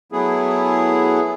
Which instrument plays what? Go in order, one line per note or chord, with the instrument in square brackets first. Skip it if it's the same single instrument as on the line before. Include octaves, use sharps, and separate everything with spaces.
[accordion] F#3 A3 B3 E4 G#4